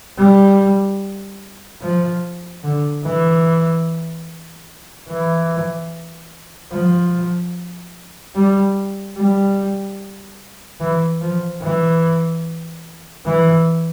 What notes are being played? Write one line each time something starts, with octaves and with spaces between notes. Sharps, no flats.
G3
F3
D3
E3
E3
F3
G3
G3
E3
F3
E3
E3